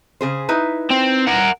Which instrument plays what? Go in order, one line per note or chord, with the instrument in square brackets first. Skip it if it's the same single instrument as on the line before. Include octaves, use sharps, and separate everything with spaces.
[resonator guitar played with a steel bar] C#3 G#4 C5
D#4 E4 B4
[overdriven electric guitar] C4
A#4 F#5